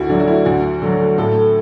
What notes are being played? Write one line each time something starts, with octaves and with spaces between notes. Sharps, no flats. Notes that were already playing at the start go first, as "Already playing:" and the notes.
Already playing: D2 E4 F#4
D3 F#3 D4
F#4
E4
D2 F#4
D3 F#3
A2 A4